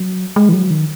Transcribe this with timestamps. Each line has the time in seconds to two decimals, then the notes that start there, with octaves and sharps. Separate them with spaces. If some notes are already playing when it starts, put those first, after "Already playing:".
Already playing: F#3
0.36 G#3
0.49 E3
0.53 F#3
0.70 D#3